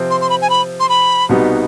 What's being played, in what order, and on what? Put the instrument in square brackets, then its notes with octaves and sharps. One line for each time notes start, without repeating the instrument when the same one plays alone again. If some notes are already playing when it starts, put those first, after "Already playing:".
Already playing: [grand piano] C3 F3 C4
[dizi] C6
C6
B5
G#5
B5
C6
B5
[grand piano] C2 B2 G3 B3 D#4